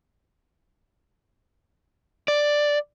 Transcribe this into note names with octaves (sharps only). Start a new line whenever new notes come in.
D5